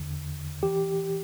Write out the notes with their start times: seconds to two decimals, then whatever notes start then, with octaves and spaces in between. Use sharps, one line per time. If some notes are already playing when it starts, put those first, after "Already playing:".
Already playing: E2 D3
0.63 E3 G4